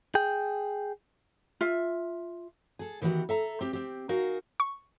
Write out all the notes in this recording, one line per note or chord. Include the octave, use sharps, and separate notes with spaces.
G#4 G5
F4 E5
G#4 A4
D#3 E3 B3 F#4 G4
A4 E5 A#5
C4 G4
C4 G4
D#4 F#4 G#4 A#4 F5
C#6